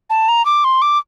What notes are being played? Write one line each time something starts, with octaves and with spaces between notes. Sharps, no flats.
A5
A#5
D6
C6
D6